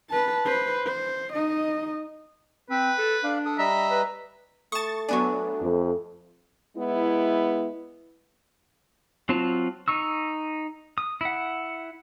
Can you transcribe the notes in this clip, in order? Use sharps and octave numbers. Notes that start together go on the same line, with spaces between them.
B4 A5
B4 C5
C5
D#4 D#5
C4 B4
A4
D4 D5 F5
A4 D#6
G3 D#5 E5 A#5
B4
A3 A5 C#6 D#6 A6
F#3 B3 D4 G#5 C#6
F2
G#3 B3 E4
F#3 C4 F4 A5
D#4 C#6 E6
D#6
E4 F#5